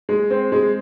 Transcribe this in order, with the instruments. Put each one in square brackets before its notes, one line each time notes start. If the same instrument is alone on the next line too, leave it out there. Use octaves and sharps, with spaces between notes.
[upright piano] G#3
C4
G#3